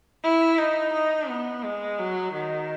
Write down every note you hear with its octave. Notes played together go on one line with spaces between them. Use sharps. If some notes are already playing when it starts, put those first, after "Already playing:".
E4
D#4
D#4
B3
G#3
F#3
D#3